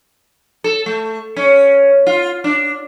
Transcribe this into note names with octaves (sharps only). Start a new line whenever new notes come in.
A4
A3
C#4
F4
D4